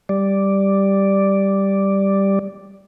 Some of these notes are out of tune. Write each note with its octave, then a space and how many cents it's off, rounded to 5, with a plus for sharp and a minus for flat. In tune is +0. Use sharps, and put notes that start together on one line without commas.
G3 +0 D5 +0